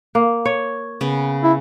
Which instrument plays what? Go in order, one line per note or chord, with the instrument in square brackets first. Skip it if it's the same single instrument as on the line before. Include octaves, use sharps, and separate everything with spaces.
[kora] A#3
C#5
[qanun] C#3 B3
[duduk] E4